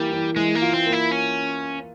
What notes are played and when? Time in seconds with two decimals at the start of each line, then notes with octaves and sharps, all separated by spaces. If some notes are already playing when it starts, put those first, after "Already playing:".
Already playing: E3 G3 A#3
0.12 E3
0.36 E3 G#3
0.55 A#3
0.61 F4
0.73 C4
0.86 A#3
0.92 E4
1.11 C#4